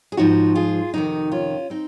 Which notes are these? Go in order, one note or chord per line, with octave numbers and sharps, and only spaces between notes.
G#4
G#2 F3 D#4 F#4
F4 G#4
F2 C3 D#3 D#4 F#4
C#4 F4
C4 D#4